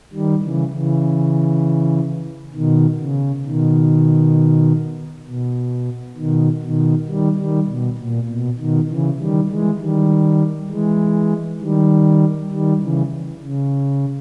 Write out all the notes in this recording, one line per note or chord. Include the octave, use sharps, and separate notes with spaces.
D#3 G3
C#3 E3
C#3 E3
B2 D#3
C#3
B2 D#3
B2
B2 D#3
B2 D#3
D#3 G3
D#3 G3
B2
A#2
B2
B2 D#3
C#3 E3
D#3 G3
E3 G#3
D#3 G3
E3 G#3
D#3 G3
D#3 G3
C#3 E3
C#3